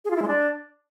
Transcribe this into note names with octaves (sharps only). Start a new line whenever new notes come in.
G#4
F4
E4
G#3
D4